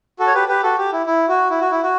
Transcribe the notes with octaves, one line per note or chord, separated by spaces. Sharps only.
F#4 A4
C#5
G4 B4
G4 B4
F#4 A4
G4
E4
E4
F#4
E4
F#4
E4
F#4